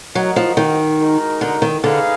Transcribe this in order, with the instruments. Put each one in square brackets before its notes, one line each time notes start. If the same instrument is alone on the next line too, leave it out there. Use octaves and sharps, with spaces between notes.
[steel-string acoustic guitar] F#3 [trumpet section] F#4 A#4 D#5 F#5
[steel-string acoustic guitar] F3
D#3
[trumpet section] G#3 D#4 F#4 A#4
[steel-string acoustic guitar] D3
D#3
[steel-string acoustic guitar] D3 [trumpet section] D#4 G#4 B4 F5